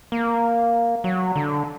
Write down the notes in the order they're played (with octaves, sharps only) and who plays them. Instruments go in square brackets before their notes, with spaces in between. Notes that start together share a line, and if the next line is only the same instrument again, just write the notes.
[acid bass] A#3
F#3
D3